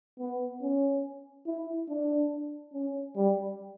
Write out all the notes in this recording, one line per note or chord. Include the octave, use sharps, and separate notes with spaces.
B3
C#4
E4
D4
C#4
G3